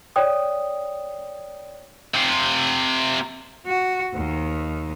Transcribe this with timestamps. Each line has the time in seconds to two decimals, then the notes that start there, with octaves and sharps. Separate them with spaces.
0.16 C#5 D5 G5 D#6
2.14 C3 F4
3.66 F#4
4.14 D#2 D#3